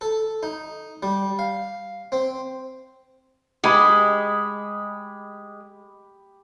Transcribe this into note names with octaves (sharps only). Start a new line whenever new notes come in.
A4
D#4
G3
F5
C4
G#3 G4 B5